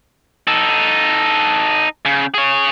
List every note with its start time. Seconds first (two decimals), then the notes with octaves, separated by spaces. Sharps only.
0.47 D#4 A4
2.05 C#3
2.34 G#4 C#5